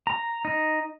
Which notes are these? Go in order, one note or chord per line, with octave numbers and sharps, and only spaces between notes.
A#5
D#4